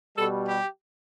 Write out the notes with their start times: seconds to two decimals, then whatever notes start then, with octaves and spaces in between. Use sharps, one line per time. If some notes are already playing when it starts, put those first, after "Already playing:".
0.16 B2 G3 A4
0.46 G4